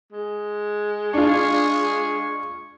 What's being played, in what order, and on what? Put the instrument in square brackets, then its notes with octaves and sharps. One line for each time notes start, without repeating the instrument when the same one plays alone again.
[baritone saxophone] G#3
[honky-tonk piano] D4 F4 [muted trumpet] G#4 [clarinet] C#6